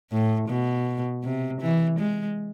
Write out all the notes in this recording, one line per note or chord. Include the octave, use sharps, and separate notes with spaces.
A2
B2
C3
E3
G#3